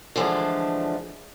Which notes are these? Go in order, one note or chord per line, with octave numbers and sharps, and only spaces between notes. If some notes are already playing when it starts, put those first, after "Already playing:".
D3 E3 F3 G#3 A3 D4